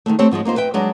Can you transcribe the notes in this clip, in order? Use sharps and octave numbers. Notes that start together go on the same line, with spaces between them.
D#3 F3 G#3 A3
A3 C4 G4 A4 C5 C#5
G#2 F3 G3 G#3
A#3 D#4 F4 C5
B4 E5 G5
F#3 G#3 D4